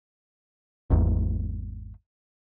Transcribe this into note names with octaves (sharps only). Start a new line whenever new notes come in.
G#1 E2 G#2